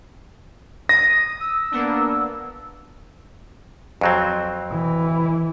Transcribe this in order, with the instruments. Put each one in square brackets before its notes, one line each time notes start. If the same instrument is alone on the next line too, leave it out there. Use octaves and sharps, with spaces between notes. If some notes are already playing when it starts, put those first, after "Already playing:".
[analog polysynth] D#6 [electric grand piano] A#6
[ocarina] E6
[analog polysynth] A#3 B3 D4
[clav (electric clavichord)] F2 F#3 C4
[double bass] E3